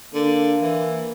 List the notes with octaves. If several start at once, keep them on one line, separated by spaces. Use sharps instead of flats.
D3 A#3
E3